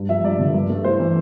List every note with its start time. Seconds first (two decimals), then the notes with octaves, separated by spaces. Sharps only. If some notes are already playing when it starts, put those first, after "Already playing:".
Already playing: G2
0.09 F3 E5
0.24 G2 D5
0.39 D3
0.54 G2
0.70 A3
0.84 E4 C5
0.99 E3